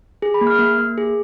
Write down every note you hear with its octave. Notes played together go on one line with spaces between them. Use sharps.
G#4
B5
A#3
F6
A#3
A#3
G#4